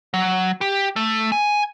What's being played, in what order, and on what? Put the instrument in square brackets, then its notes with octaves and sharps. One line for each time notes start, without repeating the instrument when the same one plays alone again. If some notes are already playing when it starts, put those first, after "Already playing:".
[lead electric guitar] F#3
G4
A3
G#5